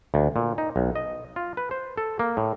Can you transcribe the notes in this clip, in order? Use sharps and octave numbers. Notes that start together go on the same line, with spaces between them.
D2
A#2
D#4
B1
D#5
F4
B4
C5
A4
A#3
A2